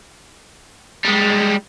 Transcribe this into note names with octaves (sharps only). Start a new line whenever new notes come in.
G3 G#3